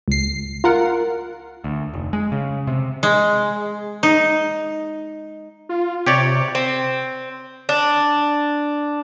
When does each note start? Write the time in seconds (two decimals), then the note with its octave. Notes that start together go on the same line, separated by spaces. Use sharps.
0.08 C#2 C7
0.64 F4 A#4 F#5
1.64 D2
1.94 F1
2.13 G#3
2.32 C#3
2.67 C3
3.03 G#3
4.03 D#4
5.69 F4
6.07 C3 G4 C#5 D5
6.55 C4
7.69 D4